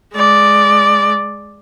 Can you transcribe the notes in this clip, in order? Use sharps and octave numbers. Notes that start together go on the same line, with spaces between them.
G#3 D5